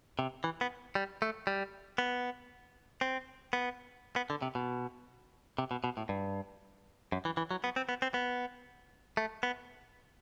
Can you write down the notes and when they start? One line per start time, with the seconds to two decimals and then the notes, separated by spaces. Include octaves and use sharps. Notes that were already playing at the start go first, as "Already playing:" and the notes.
0.19 C3
0.44 E3
0.61 B3
0.95 G3
1.22 A3
1.47 G3
1.98 B3
3.01 C4
3.53 B3
4.16 B3
4.30 D3
4.42 C3
4.55 B2
5.58 C3
5.71 B2
5.84 B2
5.97 A2
6.09 G2
7.12 F#2
7.25 E3
7.37 E3
7.51 F#3
7.64 B3
7.76 C4
7.89 B3
8.02 C4
8.14 B3
9.17 A3
9.43 B3